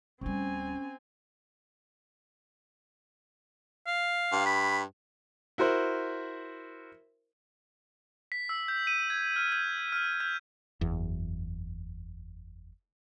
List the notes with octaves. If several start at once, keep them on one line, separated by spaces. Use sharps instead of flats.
D1 G3 C4 C#4 G#5
F5
G2
B5
E4 F#4 A#4 C5
B6
E6
G6
D#7
G#6
F6
G6
F6
G6
F#1 E2